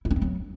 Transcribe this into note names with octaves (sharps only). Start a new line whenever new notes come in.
E4
C#4
C4
F#3